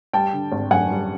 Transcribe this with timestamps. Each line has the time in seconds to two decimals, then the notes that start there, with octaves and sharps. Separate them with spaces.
0.13 G3 G5 A5
0.33 D3
0.52 G#1
0.71 F#2 F#5 G#5
0.90 G3